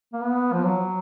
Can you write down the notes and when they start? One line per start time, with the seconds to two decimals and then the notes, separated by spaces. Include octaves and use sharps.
0.13 A#3
0.22 B3
0.53 F3
0.64 F#3